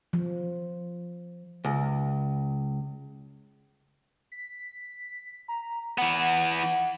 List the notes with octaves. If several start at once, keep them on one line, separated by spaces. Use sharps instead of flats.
F3
C#2
B6
A#5
E3 B3 F#5